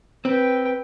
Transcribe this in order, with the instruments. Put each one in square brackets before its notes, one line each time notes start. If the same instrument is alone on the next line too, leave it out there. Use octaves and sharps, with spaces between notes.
[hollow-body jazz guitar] C4 [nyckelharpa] B4 G5